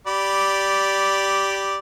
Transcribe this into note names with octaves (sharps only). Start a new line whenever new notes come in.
G4 D5 B5